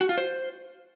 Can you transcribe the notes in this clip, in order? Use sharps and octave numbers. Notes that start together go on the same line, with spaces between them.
F#4
F4
C5